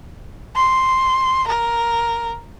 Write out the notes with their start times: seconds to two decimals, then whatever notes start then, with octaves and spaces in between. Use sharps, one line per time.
0.56 C6
1.47 A#4